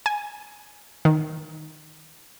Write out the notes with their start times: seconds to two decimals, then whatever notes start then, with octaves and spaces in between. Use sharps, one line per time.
0.06 G#5
1.05 D#3